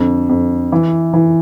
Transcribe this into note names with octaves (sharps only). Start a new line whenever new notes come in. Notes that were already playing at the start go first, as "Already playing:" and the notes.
Already playing: F2 D3
F2
E3
E3